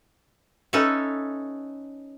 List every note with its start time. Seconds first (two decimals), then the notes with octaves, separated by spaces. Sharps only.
0.73 C#4 D#4 A4 B4 E5